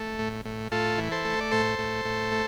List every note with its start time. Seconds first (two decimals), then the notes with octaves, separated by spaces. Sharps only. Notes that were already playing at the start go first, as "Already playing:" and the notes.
Already playing: A3
0.19 A2
0.45 A2
0.72 A2 F4 A4
0.98 E3
1.12 A4 C5
1.25 A3
1.40 D5
1.51 A2 A4 C5
1.79 A2
2.05 A2
2.32 A3